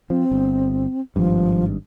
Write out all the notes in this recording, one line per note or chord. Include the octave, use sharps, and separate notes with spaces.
F3 C4
G1
G#1 G2 F3